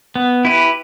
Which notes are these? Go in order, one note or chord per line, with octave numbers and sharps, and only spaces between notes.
B3
E4 G4 B4